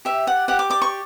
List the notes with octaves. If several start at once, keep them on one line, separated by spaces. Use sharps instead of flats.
G4 E5
D5 F#5
G4 F#5
D6
D5 D6
C#6